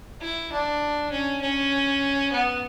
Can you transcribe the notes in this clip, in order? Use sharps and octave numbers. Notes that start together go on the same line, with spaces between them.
E4
D4
C#4
C#4
B3